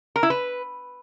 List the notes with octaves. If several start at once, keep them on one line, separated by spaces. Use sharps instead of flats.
A#4
E4
B4